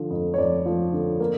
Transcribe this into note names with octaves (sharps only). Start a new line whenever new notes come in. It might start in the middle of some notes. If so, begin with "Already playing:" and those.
Already playing: D3 F3
F2
C#5
F2 D5
F3
D3
A#3